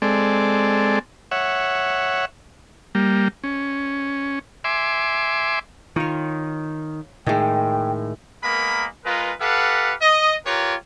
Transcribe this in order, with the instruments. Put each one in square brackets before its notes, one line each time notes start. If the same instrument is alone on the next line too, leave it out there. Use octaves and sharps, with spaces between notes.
[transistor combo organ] G#3 C4 A4 D5
C#5 E5 F#5
G3 A#3
C#4
E5 G#5 C6 D6
[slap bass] D#3 [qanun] F4 C#5
[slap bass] A2 [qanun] D#3 G#3 [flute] G5
[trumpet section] G#3 A#3 B3 A#4 B5
G#3 F4 A#4 B4
G4 A4 B4 F5 F#5
D#5
F4 G4 A#4 B4 C#5